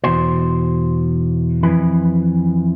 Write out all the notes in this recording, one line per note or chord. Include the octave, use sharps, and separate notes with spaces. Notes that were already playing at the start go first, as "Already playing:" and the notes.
E2 B2 C5
F2 E3 B4